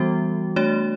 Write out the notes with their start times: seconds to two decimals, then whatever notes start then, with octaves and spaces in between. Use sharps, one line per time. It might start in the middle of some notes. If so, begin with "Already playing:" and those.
Already playing: E3 G3 B3 F#4
0.56 A3 D4 F#4 C#5